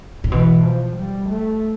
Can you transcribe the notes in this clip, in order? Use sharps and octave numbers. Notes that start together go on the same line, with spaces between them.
A2
B2 E3
F3
G3
A3